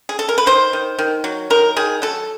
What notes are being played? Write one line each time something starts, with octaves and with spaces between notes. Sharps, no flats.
G#4
A4
A#4
B4
D#3 C5
D#3
D#3
F#3
D#3 A#4
D#3 G#4
F#3 A4